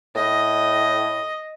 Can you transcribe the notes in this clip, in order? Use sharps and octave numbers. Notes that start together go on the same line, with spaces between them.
A2 D#5